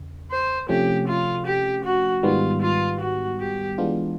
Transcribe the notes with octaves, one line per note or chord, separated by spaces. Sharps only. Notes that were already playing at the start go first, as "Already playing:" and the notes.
Already playing: E2 C#3
C5
C3 F3 A3 C#4 G4
F4
G4
F#4
G#2 D#3 G3 B3 F4
F4
F#4
G4
E3 G#3 B3 D4 F4